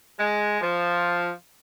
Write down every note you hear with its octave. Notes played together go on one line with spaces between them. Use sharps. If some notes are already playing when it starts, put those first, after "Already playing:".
G#3
F3